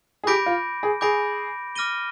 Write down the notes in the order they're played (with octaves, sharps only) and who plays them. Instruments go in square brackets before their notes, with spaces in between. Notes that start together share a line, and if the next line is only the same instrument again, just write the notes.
[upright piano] G#4
[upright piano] G4 [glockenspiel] B5 D6 G6 A#6 D7
[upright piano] F4
G#4
[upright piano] G#4 [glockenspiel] B5 D6 G6 A#6 D7
[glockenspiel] D6 F6 A#6 D#7 G7